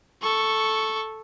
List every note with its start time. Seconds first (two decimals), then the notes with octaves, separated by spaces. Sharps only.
0.22 A4 C#6